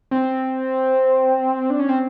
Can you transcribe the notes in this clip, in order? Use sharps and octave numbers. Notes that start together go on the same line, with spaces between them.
C4
D4
C#4
C4